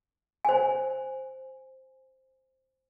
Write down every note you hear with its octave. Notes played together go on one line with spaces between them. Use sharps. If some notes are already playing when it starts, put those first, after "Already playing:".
C5 G#5